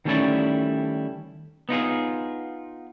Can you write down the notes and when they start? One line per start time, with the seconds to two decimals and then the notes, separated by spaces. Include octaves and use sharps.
0.05 D#3 G3 A3 C#4 E4 D5
1.69 B3 D#4 F4 G#4